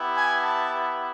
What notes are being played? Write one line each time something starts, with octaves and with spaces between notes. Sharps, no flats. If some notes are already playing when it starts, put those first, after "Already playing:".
Already playing: B3 E4 G4
G#5
A5